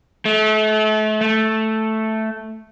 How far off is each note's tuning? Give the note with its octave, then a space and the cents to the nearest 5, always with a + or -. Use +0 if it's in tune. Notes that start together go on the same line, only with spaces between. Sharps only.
A3 -35
A3 +0